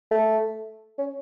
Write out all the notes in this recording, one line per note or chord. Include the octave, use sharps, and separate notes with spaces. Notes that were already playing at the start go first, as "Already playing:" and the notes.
A3
C#4